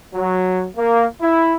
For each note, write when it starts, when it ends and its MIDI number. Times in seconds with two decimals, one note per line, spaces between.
0.13 0.66 54
0.77 1.05 58
1.21 1.56 64